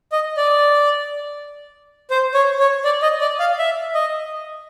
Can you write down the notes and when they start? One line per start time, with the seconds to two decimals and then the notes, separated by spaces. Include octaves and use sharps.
0.12 D#5
0.37 D5
2.10 C5
2.34 C#5
2.60 C#5
2.84 D5
3.02 D#5
3.21 D5
3.40 F5
3.59 E5
3.95 D#5